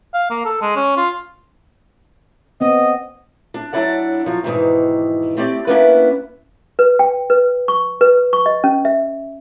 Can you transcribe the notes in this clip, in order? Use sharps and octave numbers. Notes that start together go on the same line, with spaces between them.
F5
A#3
A4
G#3
C#4
F4
B3 C4 D#5
D4
F#3 G#3 D4 E4 D5 F#5
F3 F#3
E2 G#2 B2 D#3 E3
A3 C4 G4 D5
A#3 B3 C#4 D4 E4 B4
B4
G5
B4
C#6
B4
C#6
D#5
C#4
E5